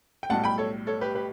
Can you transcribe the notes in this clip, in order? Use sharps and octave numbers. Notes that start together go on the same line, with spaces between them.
G5
B1 A2 G3 F#5 A5
G5 B5
A4 C#5
A4 C#5
G4 B4
G4 B4